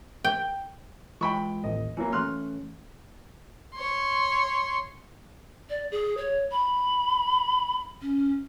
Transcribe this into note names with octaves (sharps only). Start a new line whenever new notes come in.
G5
E3 G#3 F4 G5 B5 C#6
A1 D#2 D#5
E3 F#3 A#3 E4
E3 A3 C#4 C6 F6 F#6
C#5 C6
D5
G#4
C#5
B5
C#4